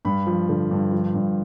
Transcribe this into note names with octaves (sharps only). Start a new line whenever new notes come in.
G2 B5
F3
D3
G2
F3
G2